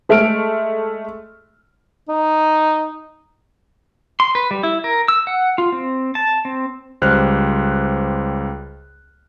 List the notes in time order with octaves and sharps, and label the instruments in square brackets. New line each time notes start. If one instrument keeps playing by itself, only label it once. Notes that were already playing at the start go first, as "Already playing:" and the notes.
[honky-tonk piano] G#3 A3 E5 F6 D7
[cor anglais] D#4
[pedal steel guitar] C6
B4
G3
E4
A#4
E6
F#5
F4
C4
A5
C4
[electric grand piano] C#2 G3 C5 F6 F#6